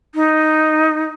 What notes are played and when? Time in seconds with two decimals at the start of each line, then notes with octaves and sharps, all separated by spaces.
0.15 D#4